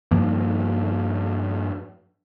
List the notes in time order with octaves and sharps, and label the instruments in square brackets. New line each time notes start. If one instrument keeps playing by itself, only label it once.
[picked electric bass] G2 F3 A#3